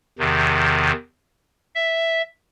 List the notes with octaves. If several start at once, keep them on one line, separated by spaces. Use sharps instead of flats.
E2 C3 D#3
E5